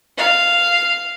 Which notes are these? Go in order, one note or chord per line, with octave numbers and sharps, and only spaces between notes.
F5